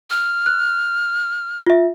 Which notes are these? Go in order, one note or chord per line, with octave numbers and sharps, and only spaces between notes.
F6
F#6
F4 E5